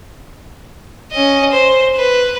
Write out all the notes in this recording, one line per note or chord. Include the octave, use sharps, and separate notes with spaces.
C#4 D#5
C5
B4